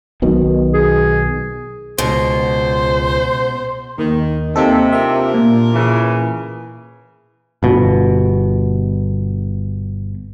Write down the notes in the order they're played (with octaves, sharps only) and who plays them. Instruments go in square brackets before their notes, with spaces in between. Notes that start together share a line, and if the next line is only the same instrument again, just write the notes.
[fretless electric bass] B1 B2 D#3
[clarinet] G#4
[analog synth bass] C#2 [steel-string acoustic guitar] B2 [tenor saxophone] C5
[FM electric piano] D#2 [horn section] D#3
[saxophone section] C3 [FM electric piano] A#3 D#4 A4 [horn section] C4
[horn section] D4 F4 A#4 [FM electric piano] E5
[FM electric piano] A#2
[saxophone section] C#3 E3
[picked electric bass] G1 B2